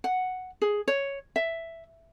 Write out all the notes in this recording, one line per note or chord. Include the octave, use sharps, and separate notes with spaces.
F#5
G#4
C#5
E5